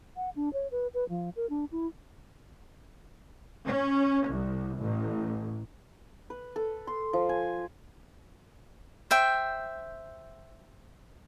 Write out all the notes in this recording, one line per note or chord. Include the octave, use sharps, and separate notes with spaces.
F#5
D4
C#5
B4
B4
F3
A#4
D4
E4
C#4
C2
A1
B4
A4
C6
F3
G#5
C5 E5 G5